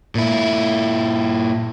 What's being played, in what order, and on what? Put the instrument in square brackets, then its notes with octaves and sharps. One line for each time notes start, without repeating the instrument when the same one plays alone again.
[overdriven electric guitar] A#2 E4